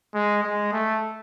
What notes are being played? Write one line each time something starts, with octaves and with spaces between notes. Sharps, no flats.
G#3
G#3
A3